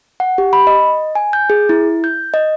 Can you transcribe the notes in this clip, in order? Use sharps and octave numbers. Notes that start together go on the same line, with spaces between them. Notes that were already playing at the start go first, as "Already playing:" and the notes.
F#5
G4
B5
D#5
G#5
G6
G#4
E4
G6
D#5